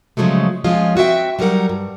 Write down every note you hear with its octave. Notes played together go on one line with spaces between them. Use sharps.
C#3 F3 F#3 G#3 A3
D2 F3 G#3 C#4 F4 D#5
C4 F#4 C#5 E5 G5
F#3 G3 D#4 A#4 F#5
G2